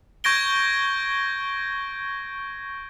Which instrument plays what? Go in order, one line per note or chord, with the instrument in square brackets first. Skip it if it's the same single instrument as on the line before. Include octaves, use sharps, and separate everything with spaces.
[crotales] C#6 G6 G#6 A#6 D7 G7